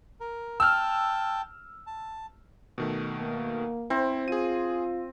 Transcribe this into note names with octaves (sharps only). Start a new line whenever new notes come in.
A#4
G5 A5 E6 F6
A5
B2 D#3 A3
A#3
C4 E4
F4 G#4 D#7